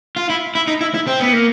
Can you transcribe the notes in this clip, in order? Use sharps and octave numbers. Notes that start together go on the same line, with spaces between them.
F4
E4
E4
D#4
E4
E4
C4
B3
A#3